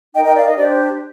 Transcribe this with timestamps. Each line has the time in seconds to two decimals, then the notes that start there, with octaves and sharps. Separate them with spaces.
0.14 D#4 A#4 D#5 G5
0.25 D#5 G5
0.35 D5 F5
0.46 D#5
0.56 D4 G4 C5 D5